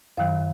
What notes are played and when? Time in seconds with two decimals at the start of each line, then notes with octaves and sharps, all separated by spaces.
0.17 F#2 D#3 F#3 F5